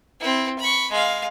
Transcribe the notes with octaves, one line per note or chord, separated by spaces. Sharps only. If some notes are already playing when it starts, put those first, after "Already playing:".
C4 E4
B5 C#6
G#3 F5